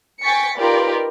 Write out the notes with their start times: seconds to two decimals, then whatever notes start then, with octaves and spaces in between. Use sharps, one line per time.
0.23 G5 G#5 C#6 A6 B6 C#7
0.56 D#4 F4 G4 A#4 B4 D5